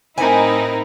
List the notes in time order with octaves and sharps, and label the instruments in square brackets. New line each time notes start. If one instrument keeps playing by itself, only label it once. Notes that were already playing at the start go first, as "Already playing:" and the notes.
[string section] A2 D#4 E4 [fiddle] C4 A#4 [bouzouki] G#5